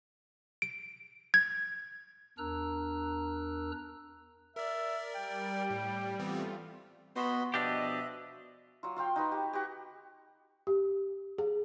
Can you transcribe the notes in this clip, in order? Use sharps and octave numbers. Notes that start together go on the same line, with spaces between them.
D7
G#6
E2 D4 A#4 A#5 E6 F#6
A#4 D5 E5
G3 G5
A2
E3 A3 B3 C4 F4
B3 F#4 D#5 B5 C6
B2 F3 D4 G4 D#5 E5
F#3 F4
F4 F5 G5
D#4 F#4 B4
G4
F#4 G4
G4
G#4